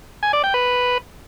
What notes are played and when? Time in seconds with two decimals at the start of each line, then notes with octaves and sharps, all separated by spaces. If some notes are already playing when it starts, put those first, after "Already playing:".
0.23 G#5
0.33 D5
0.44 G5
0.54 B4